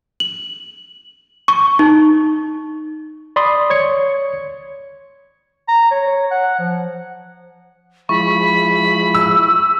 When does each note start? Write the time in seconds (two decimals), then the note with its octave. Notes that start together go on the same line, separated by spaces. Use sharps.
0.20 F#7
1.48 C#6
1.79 D#4
3.36 D5 B5 C6 D#6
3.70 C#5 G#6 C#7
5.68 A#5
5.91 C#5
6.07 C#5
6.31 F#5
6.59 F3
8.09 F3 G#3 E4 B5 C#6
9.15 E6